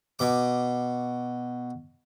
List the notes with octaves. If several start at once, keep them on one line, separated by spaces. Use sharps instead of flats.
B2 D6